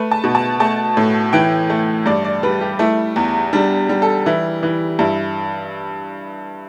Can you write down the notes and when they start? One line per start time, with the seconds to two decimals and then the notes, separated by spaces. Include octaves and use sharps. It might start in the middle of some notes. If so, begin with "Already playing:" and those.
Already playing: A3 B4
0.11 A5
0.24 B2
0.35 A5
0.60 A3 A5
0.97 A2
1.33 E3 G5
1.70 A3
2.06 G2 D5
2.24 D5
2.43 G3 B4
2.61 G4
2.79 A3 E4
3.16 E2
3.53 G3 D4
3.89 G3
4.02 A4
4.26 E3 E4
4.63 E3
4.99 G2 E4